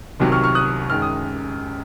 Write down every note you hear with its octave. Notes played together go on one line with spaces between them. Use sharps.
C2 C3 D#3 F#3
C#6 F6
C#6 F6
D#6 F#6
F#2 D#3 G#3 F6
D#6